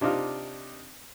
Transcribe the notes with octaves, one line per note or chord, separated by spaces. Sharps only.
C3 D4 D#4 F4 F6